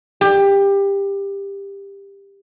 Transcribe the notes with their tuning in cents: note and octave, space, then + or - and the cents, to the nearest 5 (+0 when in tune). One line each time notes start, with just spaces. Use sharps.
G4 +20